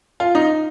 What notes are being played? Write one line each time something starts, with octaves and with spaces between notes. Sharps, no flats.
F4
D#4